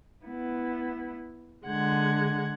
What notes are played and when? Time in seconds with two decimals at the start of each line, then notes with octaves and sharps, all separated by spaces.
0.25 B3 E4
1.67 D3 G#3 F#5 G#6